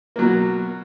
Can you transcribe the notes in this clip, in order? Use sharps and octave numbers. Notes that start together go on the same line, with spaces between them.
B2 F#3 A#3